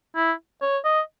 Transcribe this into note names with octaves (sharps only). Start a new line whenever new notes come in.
E4
C#5
D#5